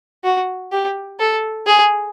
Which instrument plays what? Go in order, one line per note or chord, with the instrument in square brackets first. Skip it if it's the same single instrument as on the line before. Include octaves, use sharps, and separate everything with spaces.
[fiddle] F#4
G4
A4
G#4